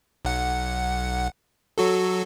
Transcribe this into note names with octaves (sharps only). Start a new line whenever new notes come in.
B1 F#5
F#3 F#4 A4